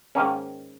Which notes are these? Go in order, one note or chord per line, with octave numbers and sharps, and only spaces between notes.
G#2 D#3 A#3 C#4